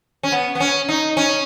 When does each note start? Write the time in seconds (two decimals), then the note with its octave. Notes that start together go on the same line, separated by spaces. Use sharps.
0.23 C#4
0.32 B3
0.55 B3
0.60 C#4
0.89 D#4
1.17 C#4